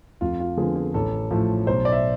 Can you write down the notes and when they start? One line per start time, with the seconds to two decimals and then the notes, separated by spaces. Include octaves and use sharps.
0.21 F2 F4
0.40 F4
0.57 D3 F3 B3 G#4
0.76 G#4
0.94 A1 A4
1.31 A2 F3
1.67 B1 C5
1.85 D5
1.92 E5